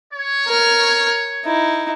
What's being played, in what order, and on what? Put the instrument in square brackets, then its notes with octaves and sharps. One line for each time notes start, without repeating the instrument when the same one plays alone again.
[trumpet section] C#5
[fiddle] A#4 F6
D#4 E4